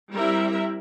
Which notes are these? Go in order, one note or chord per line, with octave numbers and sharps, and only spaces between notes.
G3 C4 E4 A#4 E5